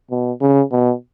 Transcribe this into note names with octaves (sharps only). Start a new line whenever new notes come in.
B2
C#3
B2